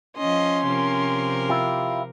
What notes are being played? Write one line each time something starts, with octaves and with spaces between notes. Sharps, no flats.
F3 C#4 D#5 C6
C3 F3 A#4
E4 F4 G4